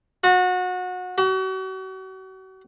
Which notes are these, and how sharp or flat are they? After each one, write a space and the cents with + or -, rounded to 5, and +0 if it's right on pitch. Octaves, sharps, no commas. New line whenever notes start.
F#4 -25
F#4 +40